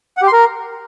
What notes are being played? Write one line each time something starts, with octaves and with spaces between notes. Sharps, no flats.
F#5
G4
C6
A#4